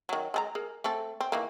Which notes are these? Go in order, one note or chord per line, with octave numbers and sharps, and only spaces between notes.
D#3 F#3
G#3 G#4 A#5
G#4 A#4
A3 C4 A4
C4
D#3 E3 A#3